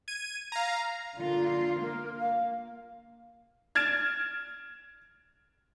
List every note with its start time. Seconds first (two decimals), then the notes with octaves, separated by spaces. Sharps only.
0.08 G#6 D#7
0.52 F5 A#5
1.18 D3 A#3 F4 A#4
1.81 A#3 A#4
2.18 F5
3.75 F6 G#6 A6 D7 E7